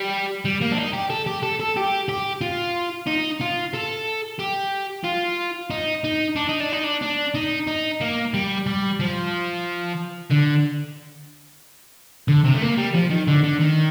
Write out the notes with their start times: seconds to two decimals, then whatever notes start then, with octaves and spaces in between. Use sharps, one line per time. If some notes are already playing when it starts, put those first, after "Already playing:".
Already playing: G3
0.45 G3
0.61 A#3
0.72 D4
0.78 D#4
0.93 G4
1.10 A4
1.26 G4
1.43 A4
1.60 A4
1.77 G4
2.09 G4
2.41 F4
3.07 D#4
3.41 F4
3.74 A4
4.39 G4
5.04 F4
5.71 D#4
6.04 D#4
6.36 D4
6.49 D#4
6.60 D4
6.72 D#4
6.83 D4
7.02 D4
7.35 D#4
7.67 D#4
8.01 A#3
8.34 G3
8.67 G3
9.00 F3
10.30 D3
12.28 D3
12.44 C3
12.54 A3
12.62 A#3
12.77 G3
12.94 F3
13.10 D#3
13.28 D3
13.44 D3
13.60 D#3